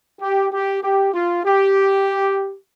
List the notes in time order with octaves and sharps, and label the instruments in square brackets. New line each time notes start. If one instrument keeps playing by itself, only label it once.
[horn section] G4
G4
G4
F4
G4